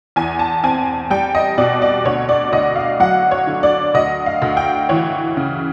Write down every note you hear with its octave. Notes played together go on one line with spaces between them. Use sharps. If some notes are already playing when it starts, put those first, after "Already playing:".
E2 G#5
A5
C4 G#5
G3 G5
D#5
B2 D5
D5
D2 C#5
D5
D2 D#5
F5
F#3 F#5
C#5
D3
D5
D2 D#5
F5
D2
G5
E3 C#5
C#3